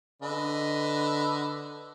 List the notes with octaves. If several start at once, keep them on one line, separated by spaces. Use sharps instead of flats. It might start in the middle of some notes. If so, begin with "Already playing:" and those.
D3 B4 D#5